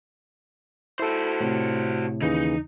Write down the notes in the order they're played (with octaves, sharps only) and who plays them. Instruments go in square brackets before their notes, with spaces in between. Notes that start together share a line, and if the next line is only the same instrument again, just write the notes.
[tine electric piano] E4 A4 [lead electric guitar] F#4 C5
[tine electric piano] A2 C3
[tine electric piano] D#2 C#3 E3 [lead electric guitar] D#4